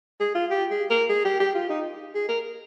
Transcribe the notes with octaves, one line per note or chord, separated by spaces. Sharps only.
G#4
F4
G4
G#4
A#4
G#4
G4
G4
F4
D#4
G#4
A#4